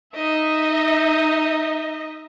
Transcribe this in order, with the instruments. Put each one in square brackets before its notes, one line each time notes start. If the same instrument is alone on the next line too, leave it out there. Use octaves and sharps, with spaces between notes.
[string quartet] D#4 D#5 E5